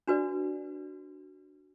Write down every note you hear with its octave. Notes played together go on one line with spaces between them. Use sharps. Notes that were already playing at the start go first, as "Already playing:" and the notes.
D4 F#4 B4 D5